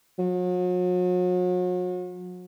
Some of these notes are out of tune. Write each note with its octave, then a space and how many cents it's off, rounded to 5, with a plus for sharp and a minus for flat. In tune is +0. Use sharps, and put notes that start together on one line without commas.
F#3 -40